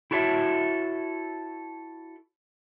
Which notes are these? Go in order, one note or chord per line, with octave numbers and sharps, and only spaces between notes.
E4 F#4 A4 C#5 E5